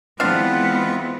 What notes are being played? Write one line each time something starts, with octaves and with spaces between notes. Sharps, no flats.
E3 G#3 B3 C4 D4 F4 F5 F#5